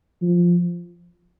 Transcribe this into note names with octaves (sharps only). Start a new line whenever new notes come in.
F3